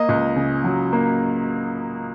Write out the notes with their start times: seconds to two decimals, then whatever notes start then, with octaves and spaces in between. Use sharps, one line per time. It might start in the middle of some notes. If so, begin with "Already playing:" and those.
Already playing: A#3 D#5
0.09 C#2
0.36 C#3
0.64 F#3
0.93 A#3